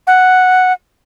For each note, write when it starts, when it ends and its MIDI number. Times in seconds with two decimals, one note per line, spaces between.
0.07 0.73 78